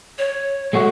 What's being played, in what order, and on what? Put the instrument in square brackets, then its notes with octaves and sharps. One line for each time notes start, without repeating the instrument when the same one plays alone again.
[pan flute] C#5
[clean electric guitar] G#3 A3 F#4